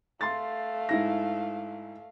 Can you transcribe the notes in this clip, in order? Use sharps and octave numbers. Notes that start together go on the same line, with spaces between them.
A3 F5 C6 A6
G#2 E4 A#6